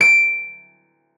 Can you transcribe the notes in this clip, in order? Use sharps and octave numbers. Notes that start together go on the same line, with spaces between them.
D7